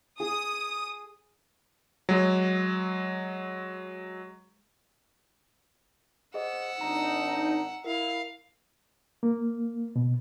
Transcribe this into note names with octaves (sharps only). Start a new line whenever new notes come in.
G#4 D#6
F#3 G#3
G#4 C5 D#5 F#5 E6
G#1 D4 D#4 A#5
E4 A#4 F5
A#3
B2